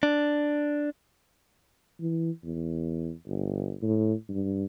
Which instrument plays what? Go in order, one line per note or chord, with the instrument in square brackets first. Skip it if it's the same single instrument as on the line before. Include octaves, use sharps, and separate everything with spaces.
[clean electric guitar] D4
[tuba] E3
E2
G1
A2
G2